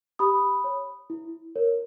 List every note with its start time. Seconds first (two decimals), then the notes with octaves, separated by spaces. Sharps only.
0.19 G4 B5 D#6
0.64 C#5
1.10 E4
1.56 A#4 C#5